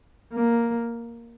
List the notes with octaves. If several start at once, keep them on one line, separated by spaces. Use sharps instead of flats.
A#3